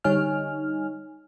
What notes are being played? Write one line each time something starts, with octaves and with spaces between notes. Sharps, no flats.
D3 G3 D#4 C#5 G#5 F6